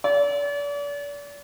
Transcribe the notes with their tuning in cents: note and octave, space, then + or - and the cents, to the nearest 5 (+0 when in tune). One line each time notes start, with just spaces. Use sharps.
D5 -40